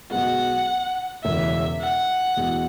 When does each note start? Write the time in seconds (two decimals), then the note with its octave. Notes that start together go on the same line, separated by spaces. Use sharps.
0.11 B1 B2 G#3 F#5
1.24 E1 E2 C#3 G#3 C#4 E5
1.80 F#5
2.37 E1 E2 B2 G#3